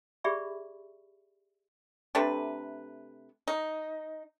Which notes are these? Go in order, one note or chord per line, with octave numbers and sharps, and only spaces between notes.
G4 G#4 D5 E5 B5 C#6
C3 A3 D4 B4
D#4